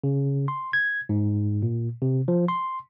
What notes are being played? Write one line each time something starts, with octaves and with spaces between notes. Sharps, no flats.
C#3
C6
G#6
G#2
A#2
C3
F3
C6